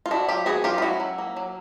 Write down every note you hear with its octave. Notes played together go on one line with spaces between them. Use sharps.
F4
D4 E4 F#4
F#3 F4 G4
B3 F#4 G#4
F#3 F4 G4
F4
C#4 E4 F#4
F#3
A#3
F#3